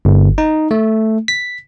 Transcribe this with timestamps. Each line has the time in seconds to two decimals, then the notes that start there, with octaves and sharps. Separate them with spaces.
0.05 G1
0.38 D#4
0.71 A3
1.28 B6